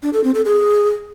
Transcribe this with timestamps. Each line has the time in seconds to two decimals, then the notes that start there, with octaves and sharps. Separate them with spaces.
0.03 D4
0.13 A4
0.24 C4
0.34 A4
0.45 G#4